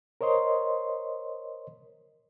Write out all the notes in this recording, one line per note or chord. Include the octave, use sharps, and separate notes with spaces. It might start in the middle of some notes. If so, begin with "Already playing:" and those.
A#4 C5 C#5 D#5 C6